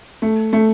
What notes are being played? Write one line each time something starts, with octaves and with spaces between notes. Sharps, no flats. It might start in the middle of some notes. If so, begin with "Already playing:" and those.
A3
A3